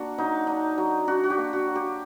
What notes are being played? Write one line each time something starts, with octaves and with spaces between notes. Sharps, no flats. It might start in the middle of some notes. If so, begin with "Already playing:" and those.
Already playing: A#3 D4 F#4
F#3 D#4
D4 D#4
F#3
D4 F#4
F#4
G4
A#3
F#4
F#3
G4